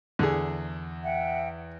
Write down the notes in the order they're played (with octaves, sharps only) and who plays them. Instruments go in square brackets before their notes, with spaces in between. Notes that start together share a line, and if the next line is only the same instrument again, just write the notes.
[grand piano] E2 [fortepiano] D3 G#4
[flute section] E5 F#5 G5